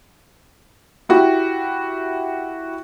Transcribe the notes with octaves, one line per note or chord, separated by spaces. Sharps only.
E4 F#4 G4